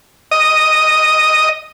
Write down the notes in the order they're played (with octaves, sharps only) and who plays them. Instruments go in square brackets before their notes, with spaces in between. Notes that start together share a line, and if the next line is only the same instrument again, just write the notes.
[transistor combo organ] D#5